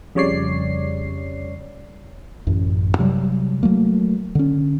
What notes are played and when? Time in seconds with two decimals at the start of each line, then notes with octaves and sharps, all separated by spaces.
0.15 F2 C#3 G3 C#5 D5 C7
2.47 A1 F#2
2.99 C3 F#3 G3
3.63 F#3 A3 A#3
4.35 D3 C#4